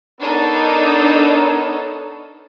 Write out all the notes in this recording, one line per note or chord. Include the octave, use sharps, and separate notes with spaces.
B3 D4 D#4 A4 A#4 C#5